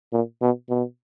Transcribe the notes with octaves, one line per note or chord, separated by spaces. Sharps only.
A#2
B2
B2